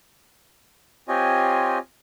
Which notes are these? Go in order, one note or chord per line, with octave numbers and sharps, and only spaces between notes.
C4 F4 G4 C#5 D#5 G#5